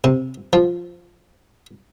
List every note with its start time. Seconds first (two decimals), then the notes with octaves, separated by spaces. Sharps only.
0.04 C3
0.53 F3